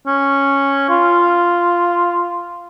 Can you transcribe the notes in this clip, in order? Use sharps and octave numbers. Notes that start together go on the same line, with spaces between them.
C#4
F4